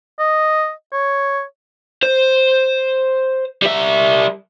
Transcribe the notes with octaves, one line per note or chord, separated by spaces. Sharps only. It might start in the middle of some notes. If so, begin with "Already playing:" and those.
D#5
C#5
C5
G3 E5